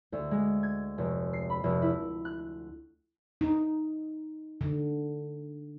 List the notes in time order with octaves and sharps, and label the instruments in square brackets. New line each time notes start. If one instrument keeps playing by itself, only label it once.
[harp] D2
G#3
G#6
F1
C7
B5
F1
E4
F#6
[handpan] D#4
D3